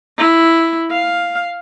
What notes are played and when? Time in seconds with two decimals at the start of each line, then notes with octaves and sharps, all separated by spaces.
0.18 E4
0.91 F5